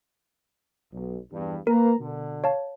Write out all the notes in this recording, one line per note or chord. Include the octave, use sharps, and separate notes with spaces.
B1
E2 G2
A#3 A#4 B4 A#5
B2 D3
C#5 F5 A5